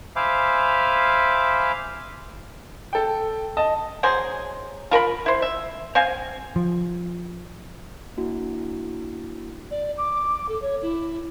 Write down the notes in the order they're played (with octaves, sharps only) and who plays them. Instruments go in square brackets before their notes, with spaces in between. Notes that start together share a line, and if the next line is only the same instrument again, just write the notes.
[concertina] C5 E5 F5 G#5 B5 D6
[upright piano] A4 G5
D#5 A5
[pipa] F#3 G#4 C5
F4 A#4 A#5 B5
E4 C5
E5
C4 F5 G#5
[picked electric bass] F3
[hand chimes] A#3 D4 E4 F#4
[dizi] D5
D6
A4
C#5
E4